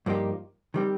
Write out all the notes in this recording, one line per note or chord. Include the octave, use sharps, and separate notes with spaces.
G2 F3 A#3 D#4 G4
D#3 G3 C4 G4